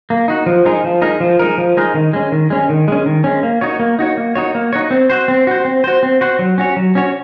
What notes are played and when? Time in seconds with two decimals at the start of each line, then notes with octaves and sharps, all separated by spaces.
0.10 A#3
0.28 D#4 F#4
0.46 F3
0.65 G#3 D#4 A#4
0.84 F3
1.02 G#3 D#4 A#4
1.20 F3
1.39 G#3 D#4 A#4
1.58 F3
1.77 G#3 D#4 A#4
1.94 D#3
2.13 G#3 C#4
2.32 D#3
2.50 G#3 C#4
2.69 D#3
2.88 G#3 C#4
3.06 D#3
3.24 G#3 C#4
3.43 A#3
3.61 D#4 F#4 C#5
3.79 A#3
3.99 D#4 F#4 C#5
4.17 A#3
4.35 D#4 F#4 C#5
4.55 A#3
4.73 D#4 F#4 C#5
4.91 C4
5.10 F#4 C5
5.28 C4
5.47 F#4 C5
5.65 C4
5.84 F#4 C5
6.03 C4
6.21 F#4 C5
6.39 F#3
6.58 C#4 F#4 C#5
6.76 F#3
6.95 C#4 F#4 C#5